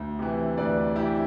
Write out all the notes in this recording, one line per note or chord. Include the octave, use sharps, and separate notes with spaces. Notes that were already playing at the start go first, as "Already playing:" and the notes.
Already playing: D2
C3 E3
D2 B4 D5
C3 E3 E4 G4